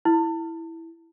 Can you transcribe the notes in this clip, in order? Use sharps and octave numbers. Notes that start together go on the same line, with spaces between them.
E4